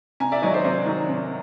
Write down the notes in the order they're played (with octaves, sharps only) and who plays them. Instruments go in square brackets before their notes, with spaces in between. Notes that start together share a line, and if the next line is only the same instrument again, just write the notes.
[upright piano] C3 G#5 A#5
D5 E5
D#3 F#3 C#5 D#5
C5 D5
C3 C5 D5
D#3 F#3
C3